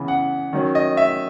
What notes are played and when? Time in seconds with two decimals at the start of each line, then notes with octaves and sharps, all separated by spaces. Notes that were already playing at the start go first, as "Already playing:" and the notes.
Already playing: C#3 E3 B3
0.08 F#5
0.53 D#3 F#3 C#4
0.75 D#5
0.97 E5